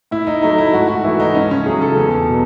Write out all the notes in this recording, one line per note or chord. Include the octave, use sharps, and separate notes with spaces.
A2 E4
D#4
F#3 A3 D#4
E4
G#2 F#4
F#4
E3 A3 E4
D#4
C#2 C#4
C#4
C#3 F#3 A3 G#4
A4
E2
B2 F#3